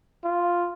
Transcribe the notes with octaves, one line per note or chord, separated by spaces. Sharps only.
F4